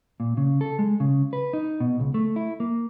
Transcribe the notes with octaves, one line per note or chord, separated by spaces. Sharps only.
A#2
C#3
A4
G#3
C#3
B4
D#4
B2
C#2
A3
E4
A#3